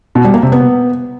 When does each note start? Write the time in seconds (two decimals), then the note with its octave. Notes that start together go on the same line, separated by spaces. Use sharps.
0.15 B2
0.25 G3
0.34 A#3
0.43 C3
0.52 B3